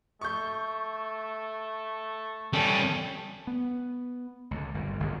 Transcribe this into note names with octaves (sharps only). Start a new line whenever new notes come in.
A3 C#6 G6
G3 C#4 A4 A5
B3
C#2 D3
G1 G2 A#2
G1 C#2 B2 D3